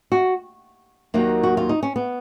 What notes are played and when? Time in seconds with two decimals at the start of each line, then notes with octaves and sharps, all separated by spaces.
0.12 F#4
1.14 D#2 D#3 F#3 A#3
1.43 F#4
1.57 F4
1.69 D#4
1.83 C#4
1.96 B3